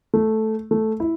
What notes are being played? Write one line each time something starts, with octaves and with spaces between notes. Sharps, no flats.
A3
A3
E4